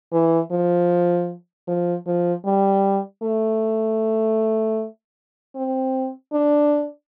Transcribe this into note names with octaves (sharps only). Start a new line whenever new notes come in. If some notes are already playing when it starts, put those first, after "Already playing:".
E3
F3
F3
F3
G3
A3
C4
D4